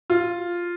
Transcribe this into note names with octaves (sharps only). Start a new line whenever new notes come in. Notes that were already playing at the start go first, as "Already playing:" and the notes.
F4